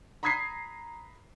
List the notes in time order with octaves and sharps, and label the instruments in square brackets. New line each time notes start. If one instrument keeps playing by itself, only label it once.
[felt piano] A#5 B5 D#6 G#6 B6 C7